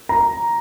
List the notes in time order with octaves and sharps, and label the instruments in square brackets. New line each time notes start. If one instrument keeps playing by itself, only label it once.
[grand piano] A#5